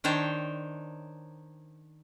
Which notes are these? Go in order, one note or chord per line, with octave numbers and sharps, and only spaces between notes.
D#3 D4 C5 C#5 G5